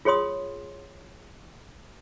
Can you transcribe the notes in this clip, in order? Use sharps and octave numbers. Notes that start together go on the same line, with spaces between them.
F4 G#4 C#5 C6 D#6